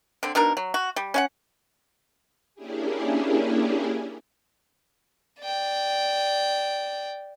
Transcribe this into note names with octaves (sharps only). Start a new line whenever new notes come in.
D3 C4
B2 D4 D#4 A#4
F#3
F#4
G3
C#4 F4 F#5
A#3 C#4 D4 E4 G4 G#4
D5 G5